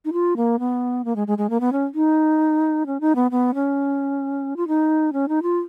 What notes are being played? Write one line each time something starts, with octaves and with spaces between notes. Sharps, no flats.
D#4
F4
A#3
B3
A#3
G#3
G#3
G#3
A#3
B3
C#4
D#4
C#4
D#4
B3
B3
C#4
F4
D#4
C#4
D#4
F4